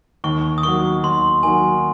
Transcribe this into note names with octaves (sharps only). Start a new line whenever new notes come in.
D#2 C#6
D#6
D#3 F#3 C#6
D#2 C6
D#3 F#3 G#5